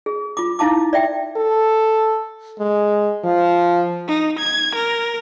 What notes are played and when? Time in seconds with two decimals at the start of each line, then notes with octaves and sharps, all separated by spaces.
0.06 G#4
0.37 F4 D6
0.59 D#4 E4 F5 A5 D6
0.93 D5 E5 G5
1.36 A4
2.59 G#3
3.24 F3
4.08 D#4
4.39 G#6
4.75 A#4